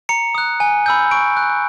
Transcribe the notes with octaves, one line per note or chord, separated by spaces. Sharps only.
A#5 C#7
D#6 F#6
G#5
B5 E6 G6
C#6 D7
F#6